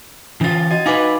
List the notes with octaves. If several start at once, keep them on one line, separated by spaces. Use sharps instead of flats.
E3 C#4 F4 A6
F#4 D#5 A6
D#4 B4 F5 G#5 D6